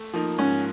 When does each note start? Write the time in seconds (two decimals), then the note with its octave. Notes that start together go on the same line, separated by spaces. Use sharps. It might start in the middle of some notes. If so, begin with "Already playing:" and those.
Already playing: A3
0.14 F3 A#3 D#4
0.38 G#2 C#4